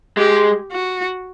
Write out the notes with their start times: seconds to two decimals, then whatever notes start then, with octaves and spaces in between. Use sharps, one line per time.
0.17 G#3 G4
0.72 F#4